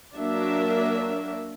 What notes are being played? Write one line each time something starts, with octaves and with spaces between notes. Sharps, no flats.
F#3 A#3 D4 F#4 A#4 E5